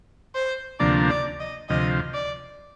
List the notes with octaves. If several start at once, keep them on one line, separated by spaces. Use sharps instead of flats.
C5
D2 C3 F3 A#3 D4 D5
D5
D#5
D2 C3 F3 D#5
D5